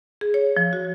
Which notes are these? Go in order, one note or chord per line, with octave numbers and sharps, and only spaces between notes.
G#4
C#5
F3
F#4